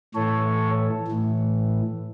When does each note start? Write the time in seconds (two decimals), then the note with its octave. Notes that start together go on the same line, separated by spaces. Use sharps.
0.15 A2 E3 A4 C#5
1.08 A2 E3